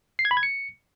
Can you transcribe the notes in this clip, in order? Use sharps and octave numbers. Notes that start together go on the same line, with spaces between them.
C7
G#6
B5
G#6
C#7